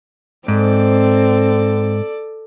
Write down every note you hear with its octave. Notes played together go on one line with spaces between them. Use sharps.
G#2 C4 A4 D5